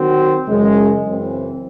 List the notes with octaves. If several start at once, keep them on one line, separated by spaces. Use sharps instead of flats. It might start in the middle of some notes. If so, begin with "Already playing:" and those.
Already playing: D#3 F#3 C4 F#4
F#2 C#3 E3 G#3
F#2 C#3 E3 C4